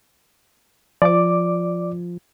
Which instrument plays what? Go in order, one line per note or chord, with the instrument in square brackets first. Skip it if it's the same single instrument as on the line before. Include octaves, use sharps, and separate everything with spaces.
[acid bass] F3 [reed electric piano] D5 D6